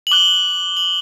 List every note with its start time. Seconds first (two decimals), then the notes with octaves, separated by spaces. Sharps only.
0.07 F#7
0.11 D6 F#6 G7
0.77 F#7